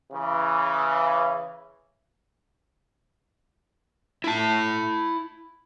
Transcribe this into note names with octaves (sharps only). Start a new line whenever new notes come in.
C#3 E3
E4 A5